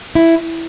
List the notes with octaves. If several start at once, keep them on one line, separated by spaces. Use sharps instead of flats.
E4